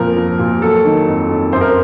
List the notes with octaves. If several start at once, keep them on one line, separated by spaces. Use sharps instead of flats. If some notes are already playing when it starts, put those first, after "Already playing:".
Already playing: F2 A#2 F3 A#4
F3
A#2
F#3 A4
D#3
F2
F2
F#2 C5
A#4